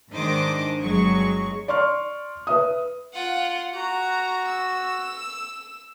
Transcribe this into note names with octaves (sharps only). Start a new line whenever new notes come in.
G#2 D#3 D4 C5 D#5 D6
G1 F#3 G#3 C#6
D5 C6 C#6 F6
B4 E5 D#6
F4 F#5
F#4 A#5
E6